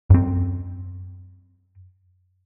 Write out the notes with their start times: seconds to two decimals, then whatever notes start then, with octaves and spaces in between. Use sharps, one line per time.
0.10 F#2 C4